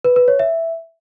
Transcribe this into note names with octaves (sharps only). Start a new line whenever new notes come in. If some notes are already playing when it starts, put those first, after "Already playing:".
B4
B4
C#5
E5